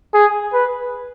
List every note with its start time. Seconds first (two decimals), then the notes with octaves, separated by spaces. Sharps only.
0.14 G#4
0.53 B4